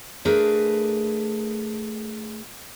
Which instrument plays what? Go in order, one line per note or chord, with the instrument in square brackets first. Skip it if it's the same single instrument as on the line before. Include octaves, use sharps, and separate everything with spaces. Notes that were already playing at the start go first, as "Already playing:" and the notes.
[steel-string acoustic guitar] A3 D4 G#4 A#4 B4